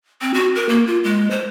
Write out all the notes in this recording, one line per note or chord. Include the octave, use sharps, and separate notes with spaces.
C4
F#4
A#4
A#3
F4
G#3
C5